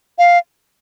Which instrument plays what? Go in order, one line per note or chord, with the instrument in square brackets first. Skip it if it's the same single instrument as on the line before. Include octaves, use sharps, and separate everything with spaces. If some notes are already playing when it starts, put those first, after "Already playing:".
[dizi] F5